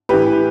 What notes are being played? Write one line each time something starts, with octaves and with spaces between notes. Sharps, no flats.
A2 E3 G4 B4